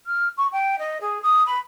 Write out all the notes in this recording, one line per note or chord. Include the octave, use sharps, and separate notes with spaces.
F6
C#6
G5
D#5
G#4
D#6
B5